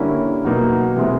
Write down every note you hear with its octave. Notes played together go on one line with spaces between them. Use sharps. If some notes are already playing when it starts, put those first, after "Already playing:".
Already playing: D3 G3 A#3 C#4 E4
E2 B2 F#3 A#3 D#4
C3 E3 G#3 C4